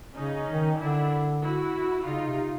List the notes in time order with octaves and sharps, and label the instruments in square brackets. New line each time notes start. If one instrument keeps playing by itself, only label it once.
[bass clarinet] C#3 [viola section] C#4 D#4
[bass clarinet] D#3
[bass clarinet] D3 [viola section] D4 E4
[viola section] E4 F#4
[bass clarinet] C#3 [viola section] D#4 F4
[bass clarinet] C3